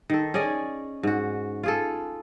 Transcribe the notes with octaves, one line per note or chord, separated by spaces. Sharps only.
D#3 A4
C#4 G#4 D5 D#5
G#2 F#4
F4 G#4 A4